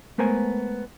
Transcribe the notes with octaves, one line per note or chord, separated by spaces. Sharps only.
G#3 A3 B3 A#4 C5 G#5